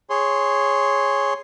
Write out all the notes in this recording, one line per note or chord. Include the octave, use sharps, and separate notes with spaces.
G#4 C#5 C6